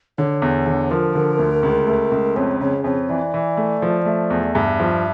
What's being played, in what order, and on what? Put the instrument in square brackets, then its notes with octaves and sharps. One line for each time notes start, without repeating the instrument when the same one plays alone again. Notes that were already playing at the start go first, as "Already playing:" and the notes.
[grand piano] D3 [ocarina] C#5
[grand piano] E2
D3
[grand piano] F3 [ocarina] A#4
[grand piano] D3
D2
C#2
A3
C#2
[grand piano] F2 [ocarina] C#5
[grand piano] C#3 [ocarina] C#5
[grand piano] F2 [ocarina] C#5
[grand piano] E3 [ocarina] D5
[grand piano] E3
A3
F3
A3
E2
[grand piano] G2 [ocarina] E5
[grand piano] F3